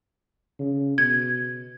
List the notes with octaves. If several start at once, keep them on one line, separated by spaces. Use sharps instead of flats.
C#3
B2 G#6